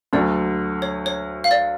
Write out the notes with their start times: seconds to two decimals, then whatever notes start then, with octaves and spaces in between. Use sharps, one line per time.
0.13 D2 D3 F#3 D5
0.82 C#5
1.06 C#5
1.44 F5
1.51 D5